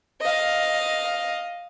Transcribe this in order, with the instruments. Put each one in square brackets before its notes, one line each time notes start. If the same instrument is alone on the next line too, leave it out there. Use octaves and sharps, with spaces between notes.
[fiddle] D#5 F5